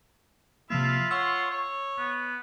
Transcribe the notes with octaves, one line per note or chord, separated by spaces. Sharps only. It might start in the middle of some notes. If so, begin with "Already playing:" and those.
C3 F3 A#3 E4 F4 E5 F5
C#5 F#5 C6 E6
C#5
B3